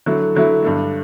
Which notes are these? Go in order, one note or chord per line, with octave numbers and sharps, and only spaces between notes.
D3 F#3 A3 E4
D3 F#3 A3 E4
G2 D3 A3